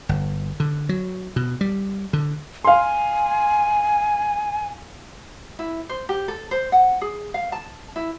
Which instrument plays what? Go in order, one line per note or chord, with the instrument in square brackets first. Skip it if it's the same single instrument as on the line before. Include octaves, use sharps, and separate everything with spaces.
[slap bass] G1
D3
F#3
B2
G3
D3
[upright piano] F5 C6 [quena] G#5
[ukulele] E4
C5
G4
A4
C5
F#5
G#4
F5
A5
E4